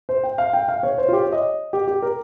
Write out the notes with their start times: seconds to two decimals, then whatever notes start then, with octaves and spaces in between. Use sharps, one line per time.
0.09 C5
0.23 G5
0.38 F5
0.53 G5
0.68 F5
0.83 C#5
0.98 C5
1.08 F4
1.13 G4
1.23 C#5
1.32 D#5
1.73 G4
1.87 G4
2.02 A#4